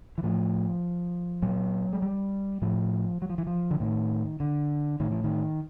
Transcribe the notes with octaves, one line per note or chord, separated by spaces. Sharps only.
E3
A2 F3
A#2 F#3
G#3
G3
A2 F3
F#3
F3
E3
F3
D3
A2 D#3
D3
A2 D#3
E3
D#3